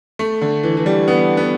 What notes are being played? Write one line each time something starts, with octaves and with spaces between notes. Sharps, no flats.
A3
D3
E3
E3
G3
B3
B3